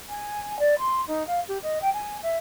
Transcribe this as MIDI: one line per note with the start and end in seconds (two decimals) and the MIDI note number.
0.10 0.57 80
0.59 0.75 74
0.79 1.02 84
1.07 1.26 63
1.27 1.40 77
1.48 1.58 67
1.63 1.79 75
1.82 1.90 79
1.94 2.18 80
2.23 2.37 76